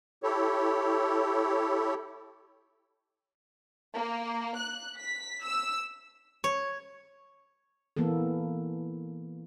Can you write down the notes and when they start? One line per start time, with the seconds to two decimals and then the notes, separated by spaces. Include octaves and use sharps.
0.23 E4 G4 A4 C#5
3.94 A#3
4.58 F#6
4.98 B6
5.45 E6
6.44 C#5
7.97 E3 A#3 B3 A4